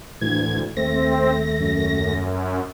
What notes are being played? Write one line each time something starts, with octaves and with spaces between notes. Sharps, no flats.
D2 A2 E3 G#6
D#2 A3 C4 A#6
F#2